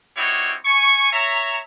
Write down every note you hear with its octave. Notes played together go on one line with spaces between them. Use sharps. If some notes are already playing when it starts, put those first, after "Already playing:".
G3 C4 D#4 E4 F#4 C#5
G#5 C#6
C#5 E5 A#5